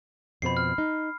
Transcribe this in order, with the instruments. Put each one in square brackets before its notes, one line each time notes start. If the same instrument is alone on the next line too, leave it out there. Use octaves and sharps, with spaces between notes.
[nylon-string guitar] F2 B2 C5 [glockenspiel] B5 C7
[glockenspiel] F6
[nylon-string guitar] D#4